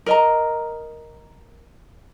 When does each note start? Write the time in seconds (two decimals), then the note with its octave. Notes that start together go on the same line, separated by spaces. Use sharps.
0.06 A#4 D#5 A#5